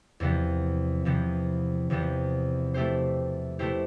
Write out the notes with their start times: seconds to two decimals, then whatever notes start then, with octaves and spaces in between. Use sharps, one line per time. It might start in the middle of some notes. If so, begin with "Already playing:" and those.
0.20 E2 C3 F3 B3
1.05 E2 C3 F3 B3
1.90 E2 C3 F3 B3
2.74 B2 A3 E4 G4 C5
3.59 B2 A3 E4 G4 C5